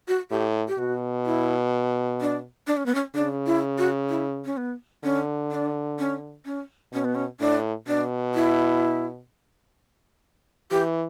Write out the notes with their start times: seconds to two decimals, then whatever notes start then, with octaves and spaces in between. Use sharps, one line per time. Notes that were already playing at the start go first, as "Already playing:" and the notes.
0.08 F#4
0.31 A2 G4
0.68 G4
0.79 B2 F#4
1.26 E4
2.21 D4
2.67 D4
2.77 C#4
2.86 B3
2.95 C#4
3.15 C#3 D4
3.46 E4
3.78 F#4
4.10 E4
4.45 C#4
4.57 B3
5.04 D3 C#4
5.52 D4
5.99 C#4
6.46 C#4
6.93 B2 C#4
7.04 B3
7.15 C#4
7.40 A2 D4
7.87 B2 D4
8.35 E4
10.71 E3 G4